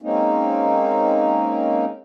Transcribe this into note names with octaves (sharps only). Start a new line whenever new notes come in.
G#3 A#3 C4 C#4 D#4